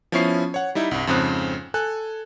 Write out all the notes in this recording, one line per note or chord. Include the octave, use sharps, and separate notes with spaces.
F3 B3 C#4 E4 C#6 C7
C#5 F#5
G3 D#4 E4
C2 G2
F2 G#2 C#3 C4 D#6 F#6
A4 G#5 F#6